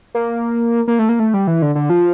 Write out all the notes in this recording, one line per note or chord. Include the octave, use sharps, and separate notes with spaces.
A#3
A#3
A3
A#3
A3
G3
E3
D3
D3
F3